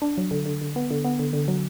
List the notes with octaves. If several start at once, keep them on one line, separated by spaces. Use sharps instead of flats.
D4
F#3
D3
D3
D3
B3
D3
B3
D3
D3
F#3